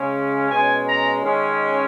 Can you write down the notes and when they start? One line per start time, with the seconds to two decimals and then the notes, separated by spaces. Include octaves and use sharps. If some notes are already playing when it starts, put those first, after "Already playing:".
Already playing: C#3 G#3 C#4
0.50 B2 G#3 C#4 G#5
0.88 A#5
1.24 D#3 G#3 C#4